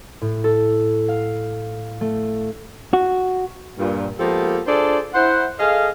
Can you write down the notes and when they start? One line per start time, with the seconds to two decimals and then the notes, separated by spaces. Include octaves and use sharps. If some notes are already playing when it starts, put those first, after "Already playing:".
0.22 A2
0.44 A4
1.08 F5
2.01 A3
2.93 F#4
3.78 G2 A#2
4.19 F3 G#3 A#3 B3 G4 A4
4.67 D4 F4 G#4 A4 C5 D5
5.14 E4 C5 F#5
5.59 G#4 A4 D#5 F5